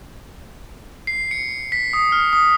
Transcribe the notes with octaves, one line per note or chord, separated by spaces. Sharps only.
C7
C#7
B6
D#6
F6
D#6